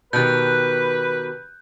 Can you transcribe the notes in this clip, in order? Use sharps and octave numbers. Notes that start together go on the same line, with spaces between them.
B2 D#3 G4 B4 F#6 G6